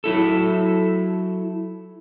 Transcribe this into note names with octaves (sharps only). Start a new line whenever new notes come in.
F#3 E4 A4